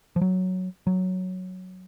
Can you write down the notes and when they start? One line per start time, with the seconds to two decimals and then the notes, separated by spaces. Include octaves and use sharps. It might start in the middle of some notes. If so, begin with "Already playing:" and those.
0.16 F3
0.21 F#3
0.87 F#3